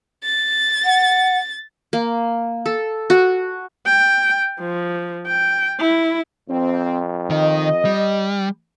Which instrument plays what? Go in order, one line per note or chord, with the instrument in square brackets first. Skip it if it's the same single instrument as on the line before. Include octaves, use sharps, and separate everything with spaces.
[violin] A6
[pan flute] F#5
[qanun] A#3
A4
F#4
[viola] G5
F3
G5
E4
[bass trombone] F2 [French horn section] C4
[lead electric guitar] D#3 [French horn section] D#5
[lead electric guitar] G3